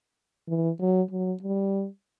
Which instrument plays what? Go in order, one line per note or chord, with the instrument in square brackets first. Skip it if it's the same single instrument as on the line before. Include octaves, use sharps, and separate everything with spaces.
[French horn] E3
F#3
F#3
G3